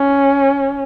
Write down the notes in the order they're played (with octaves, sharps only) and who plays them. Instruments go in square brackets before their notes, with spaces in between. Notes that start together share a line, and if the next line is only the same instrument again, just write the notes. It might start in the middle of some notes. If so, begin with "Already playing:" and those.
Already playing: [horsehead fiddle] C#4